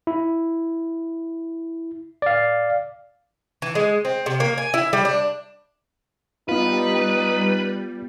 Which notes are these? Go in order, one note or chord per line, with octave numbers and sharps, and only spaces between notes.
E4
D5 F5
E3
G#3
C4
C3
A#3
G#5
E4
G3
D4
G3 B3 D#4 F4 B4